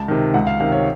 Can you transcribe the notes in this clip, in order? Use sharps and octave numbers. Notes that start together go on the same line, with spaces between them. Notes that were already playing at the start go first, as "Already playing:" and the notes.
Already playing: C#2 A5
C3 D#3
C#2 F#5
F5
C3 D#3 F5
C#5